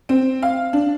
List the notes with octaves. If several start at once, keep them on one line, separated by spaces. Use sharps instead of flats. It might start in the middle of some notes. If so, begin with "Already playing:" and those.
C4
F5
D4